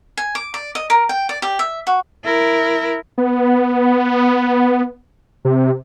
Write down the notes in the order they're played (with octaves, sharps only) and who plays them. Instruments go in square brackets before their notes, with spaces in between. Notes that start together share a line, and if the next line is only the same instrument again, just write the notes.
[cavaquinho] G#5
D6
D5
D#5
A#4
G5
D5
G4
E5
F#4
[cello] E4 A#4
[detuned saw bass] B3
C3